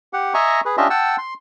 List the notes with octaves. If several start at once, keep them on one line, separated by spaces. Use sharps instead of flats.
G4 F#5
D#5 E5 G#5 A#5 C#6
G#4 B4
C#4 D4 F4 G4 D#5 E5
F#5 G5 A5 E6
C6